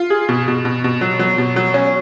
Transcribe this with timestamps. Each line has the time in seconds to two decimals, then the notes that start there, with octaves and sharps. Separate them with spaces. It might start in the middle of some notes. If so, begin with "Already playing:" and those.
Already playing: F4
0.10 G#4
0.29 B2
0.48 B2
0.65 B2
0.84 B2
1.01 F#3
1.19 F#3
1.38 B2
1.56 F#3
1.74 C#4